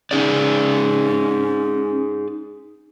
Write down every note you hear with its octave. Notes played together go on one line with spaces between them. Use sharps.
C#4 D#4 G#4 D5